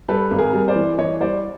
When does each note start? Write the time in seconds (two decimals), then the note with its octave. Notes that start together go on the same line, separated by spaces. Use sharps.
0.08 G3 A4 B4
0.31 G#1
0.38 G#4 A#4
0.53 G3
0.68 C5 D5
0.76 E3
0.98 E3 C#5 D#5
1.21 G3 C5 D5